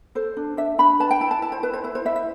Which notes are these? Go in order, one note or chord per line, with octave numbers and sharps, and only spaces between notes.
A4 C5
D4
D4 E5
D4 B5
B4 A5
G5
E4 A5
A5
E4 A5
C5
E4 B4
C5
E4 B4
C5
E4 E5
E5